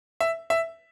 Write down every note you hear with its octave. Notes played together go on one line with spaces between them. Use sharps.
E5
E5